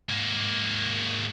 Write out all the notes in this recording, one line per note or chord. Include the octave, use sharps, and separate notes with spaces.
G#2 A#3